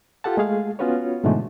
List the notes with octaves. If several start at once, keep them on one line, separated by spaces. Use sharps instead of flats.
F4 G4 A4 F#5 A5
G#3 A3 G#4 F5
B3 C#4 F4 F#4 B4 C#5
G#2 B2 D3 E3 G#3 A3